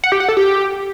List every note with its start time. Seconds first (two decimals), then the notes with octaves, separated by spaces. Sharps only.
0.04 F#5
0.12 G4
0.20 F#5
0.29 A4
0.37 G4